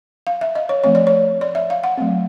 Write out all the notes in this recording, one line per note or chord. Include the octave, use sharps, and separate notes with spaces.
F5
E5
D#5
C#5
F3 A3 C4 C#5
D5
C#5
D5
E5
F5
F#5
F#3 A3 C4